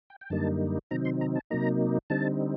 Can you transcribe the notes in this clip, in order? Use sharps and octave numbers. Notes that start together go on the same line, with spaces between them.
G5
G5
F#2 D3 G3 A#3 D#4 A5
C3 D#3 F#3 C4 D#4 A#5
C6
A#5
A5
C3 F#3 A#3 D#4 A#5
D3 G3 C4 D#4 A5